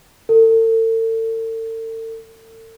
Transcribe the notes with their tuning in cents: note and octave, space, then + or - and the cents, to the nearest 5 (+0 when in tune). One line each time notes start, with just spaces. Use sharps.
A4 +40